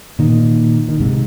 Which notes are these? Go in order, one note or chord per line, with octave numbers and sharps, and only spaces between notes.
A#2 D#3
D#3
G#2 C3